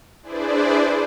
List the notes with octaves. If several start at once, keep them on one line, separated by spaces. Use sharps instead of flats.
D4 E4 G#4 B4 C5 D5